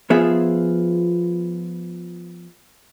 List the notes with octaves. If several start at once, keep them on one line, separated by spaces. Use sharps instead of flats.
F3 B3 F4 G#4 E5